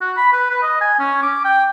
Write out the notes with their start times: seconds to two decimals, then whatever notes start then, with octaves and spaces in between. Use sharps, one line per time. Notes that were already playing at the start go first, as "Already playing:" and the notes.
0.01 F#4
0.17 B5
0.33 B4
0.50 B4
0.62 D#5
0.81 G#5
0.99 C#4
1.23 D6
1.45 G5